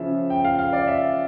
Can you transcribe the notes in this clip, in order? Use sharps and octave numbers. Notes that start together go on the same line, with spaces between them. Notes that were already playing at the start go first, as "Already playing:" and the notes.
Already playing: C#3 F3 E5
G5
F5
F5
D5
E5